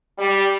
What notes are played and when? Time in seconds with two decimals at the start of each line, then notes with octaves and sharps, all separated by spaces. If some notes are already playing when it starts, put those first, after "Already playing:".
0.19 G3